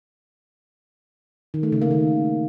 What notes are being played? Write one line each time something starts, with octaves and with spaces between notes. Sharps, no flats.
D#3
A3
C#3
A#3
D#3